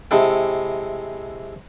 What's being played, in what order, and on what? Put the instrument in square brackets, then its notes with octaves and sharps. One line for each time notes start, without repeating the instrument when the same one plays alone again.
[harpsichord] C3 G#3 E4 A4 G5